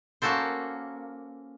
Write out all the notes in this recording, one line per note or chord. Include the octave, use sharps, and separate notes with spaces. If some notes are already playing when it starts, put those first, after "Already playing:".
A#3 C#4 F#4 A4 C5